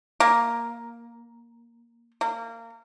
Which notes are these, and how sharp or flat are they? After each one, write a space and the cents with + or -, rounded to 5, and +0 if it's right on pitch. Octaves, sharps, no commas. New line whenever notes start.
A#3 +5
A#3 -25